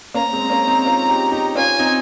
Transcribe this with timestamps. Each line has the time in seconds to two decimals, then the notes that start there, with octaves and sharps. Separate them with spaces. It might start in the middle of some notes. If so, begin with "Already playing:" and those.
0.14 A#3 C#4 A#5
0.33 G#3 C4
0.49 A#3 C#4
0.67 C4 D#4
0.85 C#4 F4
1.09 D#4 G4
1.32 D#4 G4
1.56 C#4 F4 G#5
1.79 C4 D#4